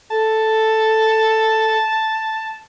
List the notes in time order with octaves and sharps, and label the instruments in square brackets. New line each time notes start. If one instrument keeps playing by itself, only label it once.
[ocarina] A4 [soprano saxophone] A5